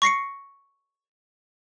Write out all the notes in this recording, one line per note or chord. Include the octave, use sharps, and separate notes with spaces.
C#6 A#6 C7 C#7